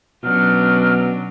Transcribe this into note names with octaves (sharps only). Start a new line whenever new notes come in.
B2 F#3 C#4 D4 F6